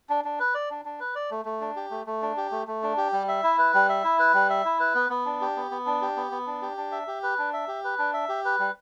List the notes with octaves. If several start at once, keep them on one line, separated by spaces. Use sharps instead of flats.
D4
D4
B4
D5
D4
D4
B4
D5
A3
A3
D4
G4
A3
A3
D4
G4
A3
A3
D4
G4
G3
E5
E4
B4
G3
E5
E4
B4
G3
E5
E4
B4
B3
B3
D4
G4
B3
B3
D4
G4
B3
B3
D4
G4
D4
E5
G4
B4
D4
E5
G4
B4
D4
E5
G4
B4
G3